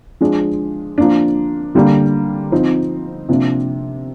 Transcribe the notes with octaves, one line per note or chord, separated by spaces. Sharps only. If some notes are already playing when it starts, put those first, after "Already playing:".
F3 G#3 D4
F3 A#3 D4
D3 G3 A#3 D4
F3 C4 D#4
C3 F3 A#3 D4